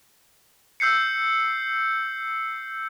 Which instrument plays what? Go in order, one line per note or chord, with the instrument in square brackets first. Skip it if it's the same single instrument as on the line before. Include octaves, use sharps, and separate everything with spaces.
[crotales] E6 G6 C7 C#7